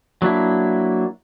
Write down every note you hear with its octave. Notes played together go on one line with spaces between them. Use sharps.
F#3 A#3 D4 E4